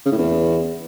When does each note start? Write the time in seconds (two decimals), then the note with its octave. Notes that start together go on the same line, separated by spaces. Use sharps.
0.05 C#3
0.11 A2
0.18 E2